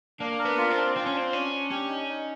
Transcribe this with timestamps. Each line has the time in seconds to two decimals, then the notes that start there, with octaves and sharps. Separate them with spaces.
0.19 A#3 D4
0.39 A#4
0.45 B3
0.58 F4
0.71 C4
0.77 D4
0.96 C4 F4
1.06 C#4
1.14 C4 D4
1.33 C#4 D4
1.52 D4
1.70 C#4 G4
1.89 D#4
2.08 D#4